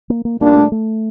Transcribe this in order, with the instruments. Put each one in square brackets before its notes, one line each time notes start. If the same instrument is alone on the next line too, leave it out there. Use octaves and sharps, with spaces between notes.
[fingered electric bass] A#3
A#3
[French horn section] A#2 G3 D4 [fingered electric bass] A#3
[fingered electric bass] A3
A3